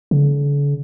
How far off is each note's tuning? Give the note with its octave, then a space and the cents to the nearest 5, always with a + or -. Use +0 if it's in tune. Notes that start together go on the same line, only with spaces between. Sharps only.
D3 -45